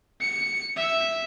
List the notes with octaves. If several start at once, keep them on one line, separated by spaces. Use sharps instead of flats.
C#7
E5